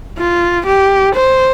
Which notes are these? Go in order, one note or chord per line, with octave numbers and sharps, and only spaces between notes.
F4
G4
C5